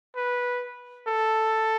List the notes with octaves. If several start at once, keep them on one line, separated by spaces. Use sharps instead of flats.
B4
A4